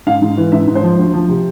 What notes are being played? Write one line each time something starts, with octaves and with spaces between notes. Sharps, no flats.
G#2 F5
G#2
E3
G#2 E5
G#2
C5
F3
D2
F3
C3